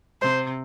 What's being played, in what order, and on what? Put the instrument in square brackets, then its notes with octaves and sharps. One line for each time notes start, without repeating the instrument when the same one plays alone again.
[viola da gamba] C3 [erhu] C5